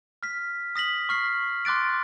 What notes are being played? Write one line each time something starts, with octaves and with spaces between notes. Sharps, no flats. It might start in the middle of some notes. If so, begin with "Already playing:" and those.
F6 B6
D#6 A#6 B6 F#7
C#6 F6 C7
C6 D6 F#6 A6 D7